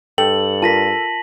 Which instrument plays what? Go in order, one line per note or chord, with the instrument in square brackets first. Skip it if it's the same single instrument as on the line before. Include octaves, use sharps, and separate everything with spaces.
[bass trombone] G2 [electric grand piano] A4 [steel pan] G5 [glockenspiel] F#7
[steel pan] F4 A#4 [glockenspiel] A5 A#6 B6